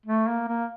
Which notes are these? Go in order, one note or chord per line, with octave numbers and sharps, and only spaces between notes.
A3
A#3
A#3